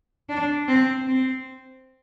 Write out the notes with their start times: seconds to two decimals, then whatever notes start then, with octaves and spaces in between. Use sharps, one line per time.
0.29 D4
0.68 C4
1.08 C4